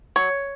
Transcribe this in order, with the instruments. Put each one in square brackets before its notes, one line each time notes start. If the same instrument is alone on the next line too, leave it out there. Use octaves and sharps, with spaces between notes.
[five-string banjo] F#3 C#5